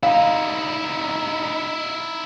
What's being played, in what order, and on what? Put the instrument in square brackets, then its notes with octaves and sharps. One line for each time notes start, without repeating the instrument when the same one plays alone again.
[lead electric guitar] D#4 E4 [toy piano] F5